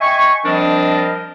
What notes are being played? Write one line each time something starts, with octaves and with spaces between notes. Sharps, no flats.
D#5 E5 G5 G#5 C#6
F3 G3 C4 D4 A#4 D#5